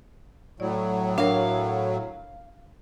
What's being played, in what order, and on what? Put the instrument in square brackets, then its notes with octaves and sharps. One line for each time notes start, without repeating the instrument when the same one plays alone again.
[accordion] A2 F#3 [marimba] D5
[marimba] D4 A#4 [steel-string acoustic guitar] F5